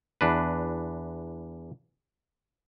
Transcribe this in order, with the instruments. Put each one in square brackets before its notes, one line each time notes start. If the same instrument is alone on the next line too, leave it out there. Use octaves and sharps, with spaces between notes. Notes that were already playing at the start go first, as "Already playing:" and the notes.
[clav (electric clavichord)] E2 D4 B4